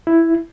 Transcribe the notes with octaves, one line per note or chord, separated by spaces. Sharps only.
E4